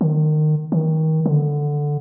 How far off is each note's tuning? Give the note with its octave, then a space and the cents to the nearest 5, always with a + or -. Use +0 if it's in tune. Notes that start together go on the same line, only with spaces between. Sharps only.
D#3 -25
D#3 +25
D3 +0